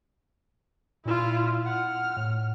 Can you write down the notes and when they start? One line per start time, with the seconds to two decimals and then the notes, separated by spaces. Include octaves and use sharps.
1.05 A#2 E4 F4
1.66 F#5 F6
2.17 A2